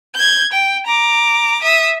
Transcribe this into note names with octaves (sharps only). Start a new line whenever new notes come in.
G6 G#6
G5
A#5 D6
E5 D#6